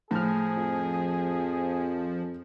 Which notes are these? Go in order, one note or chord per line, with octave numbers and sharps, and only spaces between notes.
A2 F3 G#4 F6
F2